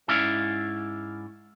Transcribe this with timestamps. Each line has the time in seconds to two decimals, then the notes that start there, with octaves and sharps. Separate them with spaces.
0.08 G#2 C#4 E4 D5 F5